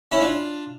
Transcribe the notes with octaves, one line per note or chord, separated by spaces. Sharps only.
C#4 E4
D4 F4